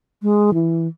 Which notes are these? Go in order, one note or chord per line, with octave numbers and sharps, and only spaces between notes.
G#3
E3